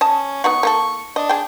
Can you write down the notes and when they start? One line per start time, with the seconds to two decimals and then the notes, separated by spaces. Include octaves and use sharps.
0.01 C#4 D#5 A5
0.44 B3 D#4 F#4 C#6
0.63 A#3 D#4 A4
1.16 D4 D#5
1.29 G#4 G5